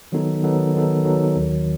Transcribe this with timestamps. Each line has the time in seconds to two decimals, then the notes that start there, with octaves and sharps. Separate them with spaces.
0.12 D#3 F#3 B3 D#4 A4
0.43 D#3 F#3 B3 D#4 A4
0.74 D#3 F#3 B3 D#4 A4
1.05 D#3 F#3 B3 D#4 A4
1.36 D#2 D#3 F#3